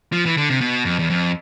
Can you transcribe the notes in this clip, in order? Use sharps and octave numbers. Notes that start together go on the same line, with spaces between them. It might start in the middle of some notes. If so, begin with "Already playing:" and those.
F3
E3
D3
C3
B2
F2
E2
F2